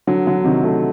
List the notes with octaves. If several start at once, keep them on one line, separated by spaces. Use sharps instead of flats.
D3 F#3
D3 F#3
C3 D#3
F#3 A3